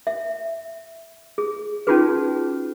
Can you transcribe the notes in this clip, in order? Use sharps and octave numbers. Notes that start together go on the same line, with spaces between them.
E5
G#4
C#4 D#4 F4 F#4 G#4 B4